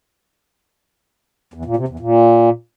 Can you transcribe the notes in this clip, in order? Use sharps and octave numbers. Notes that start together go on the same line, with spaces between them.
E2
A#2
C3
E2
A#2